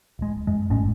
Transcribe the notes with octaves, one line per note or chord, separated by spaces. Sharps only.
D1 G#3
F#2 G#3
G#1 A2 G#3 C#4